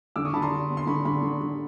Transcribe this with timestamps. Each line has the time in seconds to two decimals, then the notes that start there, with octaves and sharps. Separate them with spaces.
0.16 D3 D6 E6
0.25 C#6 D#6
0.34 D3 A5 B5
0.42 A#5 C6
0.52 D3
0.70 B3
0.77 C6
0.87 D3 B5 C#6
1.05 D3 B5 C#6
1.22 D3
1.41 D3